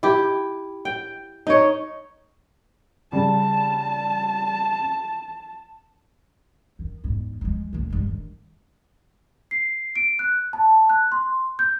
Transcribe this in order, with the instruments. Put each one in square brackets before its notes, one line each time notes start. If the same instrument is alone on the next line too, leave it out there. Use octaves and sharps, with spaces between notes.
[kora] E4 G4
G5
D#4 C#5
[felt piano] C#3 G3 [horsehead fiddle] A5
[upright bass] D#3
E2 G#2
F3 G#3
D#1 D2
G2 G#3
D#3
[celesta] C7
D7
F#6
A5
F#6
C6
G6